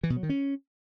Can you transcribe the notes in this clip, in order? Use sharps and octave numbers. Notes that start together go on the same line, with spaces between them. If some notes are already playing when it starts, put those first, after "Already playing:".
E3
B2
F#3
D#3
C#4